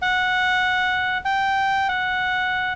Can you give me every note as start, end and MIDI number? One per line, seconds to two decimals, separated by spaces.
0.02 1.18 78
1.25 1.88 79
1.89 2.73 78